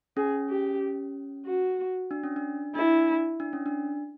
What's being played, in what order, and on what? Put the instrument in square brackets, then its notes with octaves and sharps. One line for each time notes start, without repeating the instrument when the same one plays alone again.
[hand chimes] C#4 [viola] G#4
[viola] G4
F#4
[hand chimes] D4
C#4
D4
[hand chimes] D4 [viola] E4
[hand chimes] D4
C#4
D4